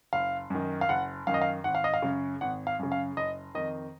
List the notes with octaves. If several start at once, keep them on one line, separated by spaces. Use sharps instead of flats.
F#1 F5
F#2 D#3
F5
F#1 F#5
F#2 D#3 F5
D#5
F5
G#1 F#5
F5
D#5
F5
F#2 C#3
G#1 F#5
F5
F#2 C#3
F5
F#1 D#5
F2 D#3 D#5